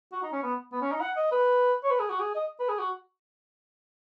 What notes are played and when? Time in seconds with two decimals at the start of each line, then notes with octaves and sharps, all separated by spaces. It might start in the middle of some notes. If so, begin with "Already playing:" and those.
0.12 F#4
0.23 D#4
0.32 C#4
0.43 B3
0.72 B3
0.82 C#4
0.92 D#4
1.01 F#5
1.17 D#5
1.31 B4
1.84 C#5
1.90 B4
2.00 G#4
2.10 F#4
2.20 G#4
2.35 D#5
2.59 B4
2.69 G#4
2.79 F#4